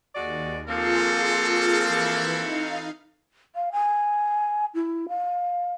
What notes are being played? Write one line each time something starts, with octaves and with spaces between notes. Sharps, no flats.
D#2 G#3 F#4 D5
F3 A#3 C4 F4 F#4 G#4 A4
E3 B5 G#6
D#4 F5
F5
G#5
E4
F5